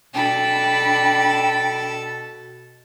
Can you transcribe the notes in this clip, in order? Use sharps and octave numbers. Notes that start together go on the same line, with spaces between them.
B2 D4 A4 G5 B5